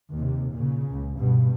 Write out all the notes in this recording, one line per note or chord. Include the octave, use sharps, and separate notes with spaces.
D#2 C3
A#2 C#3
C#2
G2 B2